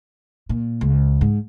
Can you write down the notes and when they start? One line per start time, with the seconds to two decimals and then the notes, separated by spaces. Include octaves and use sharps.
0.49 A#2
0.81 C#2
1.21 G#2